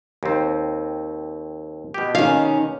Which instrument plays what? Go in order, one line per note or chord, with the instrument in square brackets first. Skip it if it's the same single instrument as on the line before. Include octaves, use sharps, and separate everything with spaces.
[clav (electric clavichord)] D#2 C4
B2 G4
[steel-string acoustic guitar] D#3 C#4 [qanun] F5